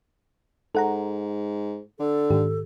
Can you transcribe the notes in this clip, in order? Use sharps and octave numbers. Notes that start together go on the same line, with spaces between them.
G#2 A4 F#5 A#5
D3 A4
G#2 D#3 G4